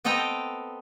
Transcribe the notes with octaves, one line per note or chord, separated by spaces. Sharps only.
B3 C4 A4 D#5 G5 A#5